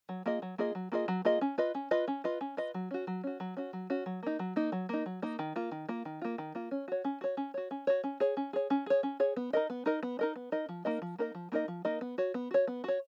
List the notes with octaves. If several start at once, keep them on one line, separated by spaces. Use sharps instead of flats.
F#3
A#3 F4 G#4 D#5
F#3
A#3 F4 G#4 D#5
F#3
A#3 F4 G#4 D#5
F#3
A#3 F4 G#4 D#5
C#4
F4 B4 D#5
C#4
F4 B4 D#5
C#4
F4 B4 D#5
C#4
F4 B4 D#5
F#3
C#4 F#4
F#3
C#4 F#4
F#3
C#4 F#4
F#3
C#4 F#4
F#3
A#3 D#4
F#3
A#3 D#4
F#3
A#3 D#4
F#3
A#3 D#4
D#3
A#3 F4
D#3
A#3 F4
D#3
A#3 F4
D#3
A#3 F4
C#4
F#4 C#5
C#4
F#4 C#5
C#4
F#4 C#5
C#4
F#4 C#5
C#4
G#4 C#5
C#4
G#4 C#5
C#4
G#4 C#5
C#4
G#4 C#5
B3
D#4 A#4 D#5
B3
D#4 A#4 D#5
B3
D#4 A#4 D#5
B3
D#4 A#4 D#5
F3
A#3 D#4 A#4 D#5
F3
A#3 D#4 A#4 D#5
F3
A#3 D#4 A#4 D#5
F3
A#3 D#4 A#4 D#5
B3
F#4 C#5
B3
F#4 C#5
B3
F#4 C#5